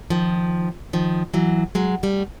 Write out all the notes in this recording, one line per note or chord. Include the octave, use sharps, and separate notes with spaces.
D#3 F3
D#3 F3
E3 F#3
F#3 G#3
G3 A3